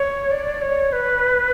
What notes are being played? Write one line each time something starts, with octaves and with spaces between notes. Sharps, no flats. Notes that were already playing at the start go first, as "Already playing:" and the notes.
Already playing: C#5
D5
C#5
B4